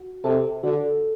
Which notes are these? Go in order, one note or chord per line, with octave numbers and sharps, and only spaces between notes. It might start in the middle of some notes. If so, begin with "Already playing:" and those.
Already playing: F#4
C3 A4
D3 F#4